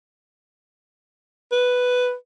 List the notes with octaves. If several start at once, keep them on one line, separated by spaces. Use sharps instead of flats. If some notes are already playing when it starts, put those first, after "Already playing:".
B4